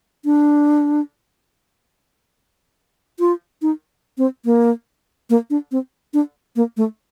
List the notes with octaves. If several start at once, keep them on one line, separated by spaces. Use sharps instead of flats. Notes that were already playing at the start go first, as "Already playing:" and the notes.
D4
F4
D#4
C4
A#3
A#3
D4
C4
D4
A#3
A3